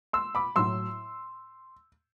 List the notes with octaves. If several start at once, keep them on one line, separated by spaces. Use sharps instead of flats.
C6 E6
B5 D6
A2 F#3 C6 E6